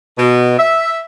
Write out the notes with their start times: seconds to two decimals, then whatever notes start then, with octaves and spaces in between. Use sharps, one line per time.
0.18 B2
0.58 E5